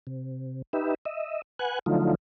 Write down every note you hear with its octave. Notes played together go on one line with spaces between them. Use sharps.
C3
D#4 G4 B4 E5
D#5 E5
B4 F#5 G#5 F#6
D3 F3 F#3 A3 D#4 F4